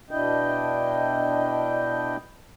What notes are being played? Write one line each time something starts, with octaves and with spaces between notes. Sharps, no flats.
B2 D4 E4 D#5 G5